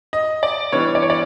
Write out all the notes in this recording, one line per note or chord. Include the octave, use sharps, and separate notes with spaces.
D#5
D5
E3 G3 B3 D4 C#5
D5
C#5
D5